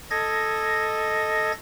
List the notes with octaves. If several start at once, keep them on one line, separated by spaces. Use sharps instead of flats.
A4 D#5 G#6 A#6